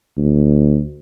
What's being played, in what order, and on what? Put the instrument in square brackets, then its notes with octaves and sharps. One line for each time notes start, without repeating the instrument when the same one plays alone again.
[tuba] D2